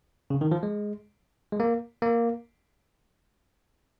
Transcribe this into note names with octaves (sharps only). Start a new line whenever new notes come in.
C#3
D#3
F3
G#3
G#3
A#3
A#3